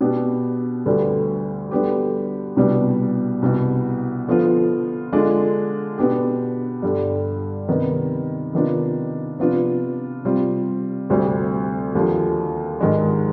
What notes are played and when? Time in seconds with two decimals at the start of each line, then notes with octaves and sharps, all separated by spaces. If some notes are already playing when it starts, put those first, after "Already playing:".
0.01 B2 B3 D4 G4
0.86 D2 D3 G3 B3
1.71 D3 G3 B3 D4 G4
2.56 C2 B2 G3 B3 D4
3.42 C2 B2 B3
4.28 D3 F3 B3 F4
5.12 D3 G#3 D4 F4
5.98 B2 B3 D4 G4
6.82 G2 D3 G3
7.68 C3 D#3 B3
8.53 C3 D#3 B3 D4 F4
9.39 C3 F3 B3 D4 F4
10.24 C3 G3 C4 F4
11.10 D2 C3 G3 C4
11.95 D#2 D3 F3
12.80 G#2 D#3 G#3 D4